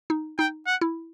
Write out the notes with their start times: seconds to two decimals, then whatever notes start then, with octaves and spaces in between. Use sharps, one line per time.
0.10 D#4
0.39 D#4 G5
0.67 F#5
0.81 E4